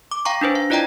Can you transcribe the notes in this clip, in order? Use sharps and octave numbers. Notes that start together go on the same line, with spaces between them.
D6
F5 G5 A#5 C#6
D4 D#4 B4 C5
F5
E4 F4 D5 D#5 G5 A#5